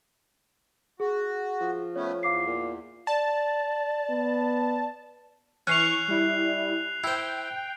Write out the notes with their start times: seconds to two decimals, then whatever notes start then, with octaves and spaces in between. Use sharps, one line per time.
1.00 F#4 G#4
1.61 F3
1.96 A3 B3 C#4 C#5
2.23 E2 F5 D6 C7
2.47 A#2
3.07 D5 A5
4.10 B3
5.67 E3 C#4 C#6 F#6 C7 F7
6.08 G3 E4
7.04 E4 C5 G5